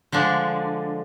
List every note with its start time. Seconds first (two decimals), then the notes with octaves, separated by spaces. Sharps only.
0.12 D3 F3 G#3 D4